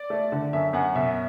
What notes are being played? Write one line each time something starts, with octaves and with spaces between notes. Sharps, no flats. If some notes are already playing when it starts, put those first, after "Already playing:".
Already playing: D5
A3
D3
F#2 E5
F#2 F#5
B2 E5